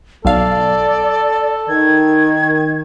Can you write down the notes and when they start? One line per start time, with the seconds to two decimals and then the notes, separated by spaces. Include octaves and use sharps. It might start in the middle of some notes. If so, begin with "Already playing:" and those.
0.25 B1 A4 D5 F5
1.69 D#3 G#6